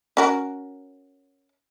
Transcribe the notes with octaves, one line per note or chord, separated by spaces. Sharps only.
C#4 F#4 A#4